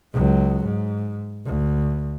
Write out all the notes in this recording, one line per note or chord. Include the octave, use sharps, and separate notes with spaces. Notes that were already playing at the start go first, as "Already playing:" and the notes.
C#2 F#3
G#2
D2